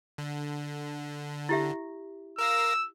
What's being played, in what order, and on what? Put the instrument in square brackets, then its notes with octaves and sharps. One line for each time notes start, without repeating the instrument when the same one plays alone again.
[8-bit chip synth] D3
[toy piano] E4 G4 E5
[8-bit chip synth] A#4 F5 A#6 [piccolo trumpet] E6